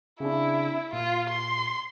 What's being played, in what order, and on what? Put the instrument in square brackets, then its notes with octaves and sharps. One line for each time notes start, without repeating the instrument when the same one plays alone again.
[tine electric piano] C#3 C4 D4 [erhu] E4
[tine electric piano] A#2 [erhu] F4
[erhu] C6